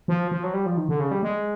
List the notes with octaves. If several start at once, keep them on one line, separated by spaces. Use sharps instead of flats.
F3
F3
F#3
G3
F3
D#3
D3
C#3
G3
G#3